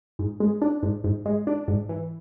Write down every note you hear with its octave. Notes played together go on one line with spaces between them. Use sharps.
G#2
G#3
D4
G#2
G#2
G#3
D4
G#2
E3